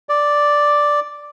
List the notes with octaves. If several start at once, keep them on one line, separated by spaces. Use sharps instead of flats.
D5